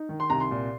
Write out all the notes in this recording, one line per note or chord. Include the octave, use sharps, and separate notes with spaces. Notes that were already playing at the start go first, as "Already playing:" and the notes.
Already playing: D#4
D#3
C6
C2 A#5
C6
A#2